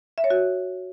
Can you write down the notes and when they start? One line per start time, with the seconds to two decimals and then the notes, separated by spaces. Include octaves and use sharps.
0.18 E5
0.24 C#5
0.30 F#4